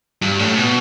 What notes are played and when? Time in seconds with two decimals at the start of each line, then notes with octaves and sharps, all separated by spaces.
0.22 G2
0.39 A2
0.57 B2